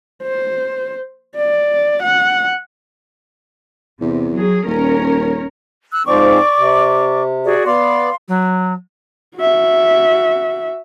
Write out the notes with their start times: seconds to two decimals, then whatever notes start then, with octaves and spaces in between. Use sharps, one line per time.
0.23 C5
1.36 D5
2.02 F#5
4.01 E2 C3
4.34 F#3 G#4
4.66 D#1 C#4 A#4 C#5
5.92 E6 F#6
6.06 G#2 F3 C4 D5 C#6 D6
6.58 C3
7.45 F#4 G#4 D5
7.66 B3 D5 F5 C6
8.28 F#3
9.36 F#4 E5